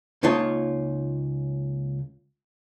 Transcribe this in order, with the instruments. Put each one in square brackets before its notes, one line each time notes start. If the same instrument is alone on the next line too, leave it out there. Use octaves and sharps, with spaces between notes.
[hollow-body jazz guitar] C#2 A#3 D#4 F4 C#5 A5